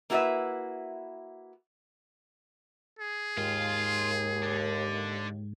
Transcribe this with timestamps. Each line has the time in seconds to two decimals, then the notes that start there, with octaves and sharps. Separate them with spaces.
0.10 A#3 E4 F#4 A#4 B4 E5
2.99 G#4
3.37 D#2 G#2 F4
4.42 D3 D4